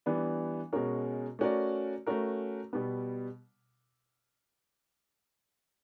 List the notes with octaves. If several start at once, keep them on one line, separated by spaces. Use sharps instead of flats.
E3 G3 B3 D4
B2 G#3 C#4 F#4 A#4
A3 C#4 F#4 A#4 D5
A3 C#4 F#4 A#4
B2 G3 B3